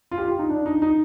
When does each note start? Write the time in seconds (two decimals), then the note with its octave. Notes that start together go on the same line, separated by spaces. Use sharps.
0.11 F4
0.18 G4
0.28 F4
0.39 D#4
0.50 D4
0.66 D#4
0.82 D#4